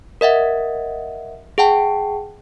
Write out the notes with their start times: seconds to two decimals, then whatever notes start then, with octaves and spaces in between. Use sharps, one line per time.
0.21 A#4 D#5 E5 F#5
1.58 G#4 F#5 G5 A5